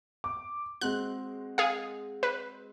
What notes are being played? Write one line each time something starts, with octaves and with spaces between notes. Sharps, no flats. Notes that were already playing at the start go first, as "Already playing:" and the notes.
D6
G#3 C4 F#4 F#6
G#4 F5
B4